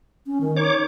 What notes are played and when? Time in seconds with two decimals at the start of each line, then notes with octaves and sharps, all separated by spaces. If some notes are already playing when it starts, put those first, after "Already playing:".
0.26 C#4
0.41 D#3
0.56 D#4 C#5 D6